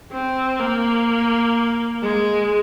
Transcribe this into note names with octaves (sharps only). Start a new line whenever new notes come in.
C4
A#3
G#3